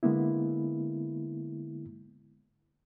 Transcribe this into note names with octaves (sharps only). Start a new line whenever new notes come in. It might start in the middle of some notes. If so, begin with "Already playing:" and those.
D3 G#3 A#3 B3 E4